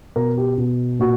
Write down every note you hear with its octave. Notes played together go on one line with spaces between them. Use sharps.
B2 A#4
G4
B2
A#2 F#4